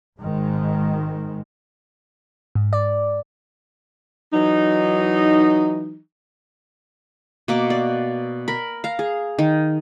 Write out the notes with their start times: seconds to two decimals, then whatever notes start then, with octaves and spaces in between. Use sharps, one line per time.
0.20 G#1 G#2 D#3 G#3
2.55 G#2
2.73 D5
4.33 E3 F#3 D#4
7.48 B2 A#3 D6
7.70 D5
8.48 A#4 B5
8.84 F5 A#5
8.99 G#4
9.38 D#3